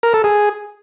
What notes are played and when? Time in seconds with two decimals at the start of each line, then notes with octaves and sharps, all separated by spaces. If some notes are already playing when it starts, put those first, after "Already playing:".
0.03 A#4
0.14 A4
0.24 G#4